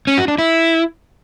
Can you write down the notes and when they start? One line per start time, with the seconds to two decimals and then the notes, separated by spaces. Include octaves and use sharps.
0.07 C#4
0.18 F#4
0.28 D4
0.38 E4